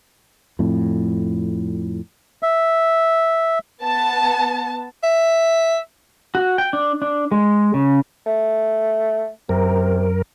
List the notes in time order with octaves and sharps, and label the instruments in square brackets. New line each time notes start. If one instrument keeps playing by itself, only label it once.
[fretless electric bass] F2 A2
[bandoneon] E5
[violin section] B3 A5
[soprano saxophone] E5
[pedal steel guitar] F#4
G5
D4
D4
G#3
C#3
[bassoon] A3
[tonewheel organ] F#2 A#4 [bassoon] C3